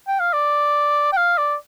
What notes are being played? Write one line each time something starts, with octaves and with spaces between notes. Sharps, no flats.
G5
F5
D5
G5
F5
D5